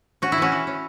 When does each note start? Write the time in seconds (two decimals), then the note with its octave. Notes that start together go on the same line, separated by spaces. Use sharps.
0.22 C#4 F#4
0.32 E4
0.38 E3 C#4 F#4
0.52 E3
0.67 C#4